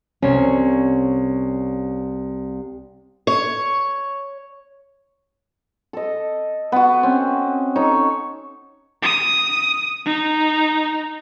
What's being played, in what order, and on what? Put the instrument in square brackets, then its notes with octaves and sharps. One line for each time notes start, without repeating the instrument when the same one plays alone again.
[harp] C2 C#5 [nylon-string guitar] C#4
[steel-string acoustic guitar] C#5
[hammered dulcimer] A4 D#5
B3 F#4
C4 C#4
D#4 A4 C#5
[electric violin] D#6
D#4